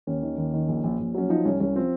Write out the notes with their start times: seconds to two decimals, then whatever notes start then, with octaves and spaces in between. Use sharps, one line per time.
0.07 D#2 C#4
0.22 D#3
0.38 D#2
0.53 D#3
0.68 A#1
0.84 A#1
1.00 A#1
1.14 F#3 C#4
1.29 F3 D#4
1.45 C2 C#4
1.60 C2 C#4
1.75 F3 C4